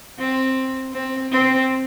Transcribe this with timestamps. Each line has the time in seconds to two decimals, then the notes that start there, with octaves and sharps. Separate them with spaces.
0.19 C4
0.93 C4
1.31 C4